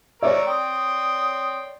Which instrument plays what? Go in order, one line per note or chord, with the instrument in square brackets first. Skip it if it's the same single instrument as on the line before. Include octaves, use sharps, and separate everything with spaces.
[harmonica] A#4 C#6 E6 [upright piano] C#5 D5
[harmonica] G5 C6 [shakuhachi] D#6